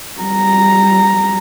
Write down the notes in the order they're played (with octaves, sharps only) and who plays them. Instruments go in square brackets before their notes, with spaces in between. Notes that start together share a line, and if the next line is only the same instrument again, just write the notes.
[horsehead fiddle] G3 A#5